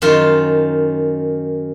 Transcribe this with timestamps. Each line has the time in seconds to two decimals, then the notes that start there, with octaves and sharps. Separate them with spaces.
0.02 F#2 D#3 F4 F5